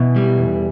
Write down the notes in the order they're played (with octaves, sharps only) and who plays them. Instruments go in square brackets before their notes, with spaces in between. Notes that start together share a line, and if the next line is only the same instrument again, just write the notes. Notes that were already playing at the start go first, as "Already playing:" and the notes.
Already playing: [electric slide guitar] B2 [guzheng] E3
[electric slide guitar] G3
E2